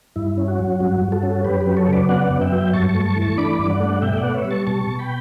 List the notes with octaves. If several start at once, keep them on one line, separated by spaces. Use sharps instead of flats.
G2 E4
C#4
F#4
F#3
G2 F#4
G2
F#4 A4
C#4
F#2 G4 B4
G4 B4
F#3
A4 C#5
C#3
B4 D5
B3 D5 F#5
F#2
E5 G5
F#3
G2 A5 C#6
A5 C#6
A3
A5 C#6
E3
A5 C#6
D4 B5 D6
G2
D5 F#5
A3
B2 E5 G5
G5
D5 F#5
B3
C#5 E5
G3
A5 C#6
B2 A5 C#6
B2
G5 B5